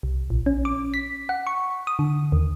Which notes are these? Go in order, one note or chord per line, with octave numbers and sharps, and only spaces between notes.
C2
A#1
C#4
D6
B6
F#5
C#6
D#6
D3
D#2